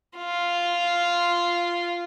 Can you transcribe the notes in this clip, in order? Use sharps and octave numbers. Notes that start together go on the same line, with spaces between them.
F4